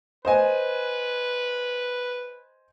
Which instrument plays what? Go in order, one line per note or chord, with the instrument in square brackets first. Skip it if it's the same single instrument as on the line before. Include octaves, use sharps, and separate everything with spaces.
[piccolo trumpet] B4 [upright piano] C5 D#5 G#5